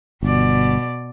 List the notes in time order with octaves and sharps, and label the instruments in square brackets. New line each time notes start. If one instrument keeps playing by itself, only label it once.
[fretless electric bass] G1 [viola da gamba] B2 D5